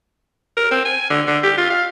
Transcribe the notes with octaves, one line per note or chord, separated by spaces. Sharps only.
A#4
C4
G#5
D3
D3
G4
F4
F5